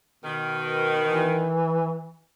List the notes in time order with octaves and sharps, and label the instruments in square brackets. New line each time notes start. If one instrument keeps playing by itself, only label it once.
[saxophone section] B2 D#3
[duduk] E3